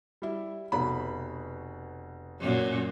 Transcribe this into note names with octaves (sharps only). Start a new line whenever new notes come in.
G3 E4
F1 B2 B5
F#2 A#2